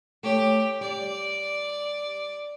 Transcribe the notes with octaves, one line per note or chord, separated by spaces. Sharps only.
A3 G4 C#5
G3 D5